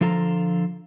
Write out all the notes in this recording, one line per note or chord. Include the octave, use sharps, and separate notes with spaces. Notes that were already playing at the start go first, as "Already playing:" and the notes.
D3 F3 F4 A4 A#5